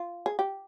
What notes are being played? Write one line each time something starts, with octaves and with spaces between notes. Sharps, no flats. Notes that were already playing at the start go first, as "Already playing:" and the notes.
Already playing: F4
G#4
G4